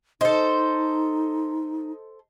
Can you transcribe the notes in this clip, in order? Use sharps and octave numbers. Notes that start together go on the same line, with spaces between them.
D#4 A4 C5 D#5